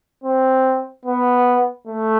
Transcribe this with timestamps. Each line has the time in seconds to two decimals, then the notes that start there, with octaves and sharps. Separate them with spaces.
0.24 C4
1.06 B3
1.87 A3